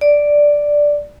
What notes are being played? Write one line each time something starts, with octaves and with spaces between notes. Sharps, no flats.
D5